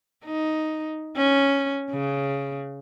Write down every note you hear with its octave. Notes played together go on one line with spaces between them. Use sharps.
D#4
C#4
C#3